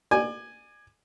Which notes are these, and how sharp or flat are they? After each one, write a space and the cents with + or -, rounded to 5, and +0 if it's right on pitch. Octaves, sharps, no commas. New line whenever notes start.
D5 +35 G#5 -5